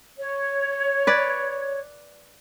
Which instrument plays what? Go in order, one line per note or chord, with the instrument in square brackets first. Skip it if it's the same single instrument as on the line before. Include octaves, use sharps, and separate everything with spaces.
[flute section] C#5
[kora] B4 D5